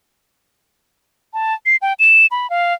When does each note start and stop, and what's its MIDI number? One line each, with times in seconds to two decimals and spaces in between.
1.34 1.54 81
1.66 1.76 96
1.82 1.93 79
1.99 2.26 100
2.31 2.49 83
2.50 2.74 77